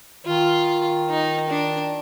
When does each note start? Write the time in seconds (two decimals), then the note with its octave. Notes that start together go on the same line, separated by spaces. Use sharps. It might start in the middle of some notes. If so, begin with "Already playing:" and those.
0.26 D#3 F4
1.10 D#4
1.50 D4